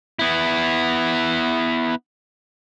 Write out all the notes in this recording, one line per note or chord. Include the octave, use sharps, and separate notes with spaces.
B3 E4